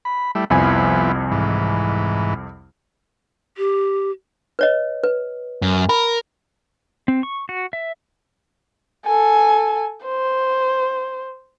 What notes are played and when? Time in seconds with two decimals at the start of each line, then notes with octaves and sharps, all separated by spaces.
0.05 B5
0.35 G3 A3 E4
0.50 C2 F2 F3 B3 E4 G#5
1.31 G#2 E3
3.57 G4
4.59 B4 C#5 D#5
5.04 B4
5.62 F#2
5.89 A#4 B5
7.08 C4
7.23 C#6
7.49 F#4
7.73 E5
9.06 A4 G#5
10.05 C5